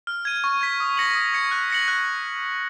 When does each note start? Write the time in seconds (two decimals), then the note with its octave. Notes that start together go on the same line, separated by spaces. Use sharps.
0.07 F6
0.25 G#6 D#7
0.44 C#6
0.61 G#6 B6
0.80 D#6
0.97 A#6 C#7 F#7
1.15 D#6
1.33 G#6 C#7
1.51 F#6
1.70 A#6 C#7 F#7
1.88 F#6